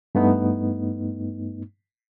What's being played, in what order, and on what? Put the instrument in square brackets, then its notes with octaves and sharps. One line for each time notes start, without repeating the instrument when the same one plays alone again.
[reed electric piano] G2 A3 B3 D#4